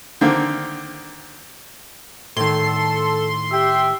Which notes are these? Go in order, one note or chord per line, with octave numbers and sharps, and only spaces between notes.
D3 D#3 A#3 C4
A2 D#3 A4 C6
G4 E5 G5